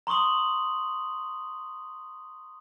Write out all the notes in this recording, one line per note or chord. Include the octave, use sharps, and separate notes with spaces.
A#5 C6 C#6 D#6 F#7